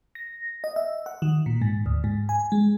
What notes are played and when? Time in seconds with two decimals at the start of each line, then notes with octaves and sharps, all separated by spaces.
0.15 A#6
0.64 D#5
0.76 E5
1.06 F#5
1.22 D#3
1.46 A#2
1.62 G#2
1.86 D2
2.04 G#2
2.29 G#5
2.52 G#3